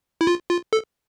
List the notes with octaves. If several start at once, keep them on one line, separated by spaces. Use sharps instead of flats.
E4
F4
F4
A4